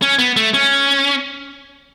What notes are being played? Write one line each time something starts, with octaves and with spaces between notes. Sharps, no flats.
C#4
B3
A3
C#4